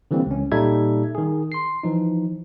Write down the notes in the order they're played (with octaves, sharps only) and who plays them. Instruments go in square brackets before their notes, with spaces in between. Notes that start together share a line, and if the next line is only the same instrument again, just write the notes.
[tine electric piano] D3 E3 G3 A#3 C4
C#2 C#4
A#2 G3 D#4 A4 E5 G#6
D#3 G#4
C6 C7
E3 F3 D#4